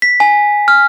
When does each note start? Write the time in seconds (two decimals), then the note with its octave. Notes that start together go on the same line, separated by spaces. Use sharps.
0.02 B6
0.20 G#5
0.68 F6